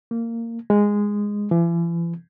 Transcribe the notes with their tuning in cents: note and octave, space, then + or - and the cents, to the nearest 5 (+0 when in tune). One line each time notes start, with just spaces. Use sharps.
A#3 -15
G#3 -10
E3 +40